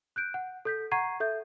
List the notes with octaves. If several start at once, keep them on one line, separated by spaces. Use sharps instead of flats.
F#6 G6 D7
F#5
A4 G6 B6
F#5 A#5 C#6 G#6 C7 D#7
A4 E5 G6